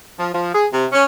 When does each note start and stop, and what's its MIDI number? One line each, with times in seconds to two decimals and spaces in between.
0.17 0.31 53
0.32 0.52 53
0.52 0.66 68
0.71 0.84 48
0.92 1.03 61